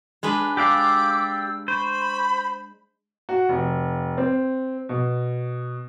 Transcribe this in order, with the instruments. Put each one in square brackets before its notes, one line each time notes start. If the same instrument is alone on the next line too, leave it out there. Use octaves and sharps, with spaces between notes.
[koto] G#3 D4 B4
[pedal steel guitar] G4 D5 F5 [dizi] D6 [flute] E6
[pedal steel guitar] C5 [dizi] B5 [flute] C#6
[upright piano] F#4
F1
C4
B2